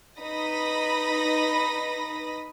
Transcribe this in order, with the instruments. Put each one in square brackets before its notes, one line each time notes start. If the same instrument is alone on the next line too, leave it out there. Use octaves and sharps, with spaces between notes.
[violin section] D#4 B4 B5 D#6 A#6